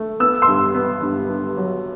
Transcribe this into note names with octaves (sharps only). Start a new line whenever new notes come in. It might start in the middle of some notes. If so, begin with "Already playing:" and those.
Already playing: A3
B3 E6
C6 E6
G2
B3
G2
G2
F#3